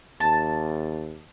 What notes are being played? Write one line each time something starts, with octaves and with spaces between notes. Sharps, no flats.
D#2 A5